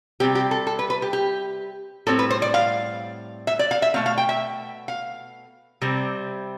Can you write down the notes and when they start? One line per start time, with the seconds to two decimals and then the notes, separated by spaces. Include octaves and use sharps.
0.20 C3 G3 C4 G4
0.35 G4
0.51 A4
0.67 A4
0.79 B4
0.90 B4
1.02 G4
1.13 G4
2.07 A2 G3 C4 A4
2.19 B4
2.30 C5
2.42 D5
2.54 F5
3.47 E5
3.59 D5
3.71 F5
3.82 E5
3.94 B2 A3 C4 F5
4.06 F5
4.18 G5
4.29 E5
4.88 F5
5.82 C3 G3 C4